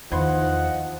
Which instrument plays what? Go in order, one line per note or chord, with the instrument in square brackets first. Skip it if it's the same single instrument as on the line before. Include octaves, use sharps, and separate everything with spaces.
[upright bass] E2 [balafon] D#3 D#4 C5 [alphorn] F3 [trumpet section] D#5 F#5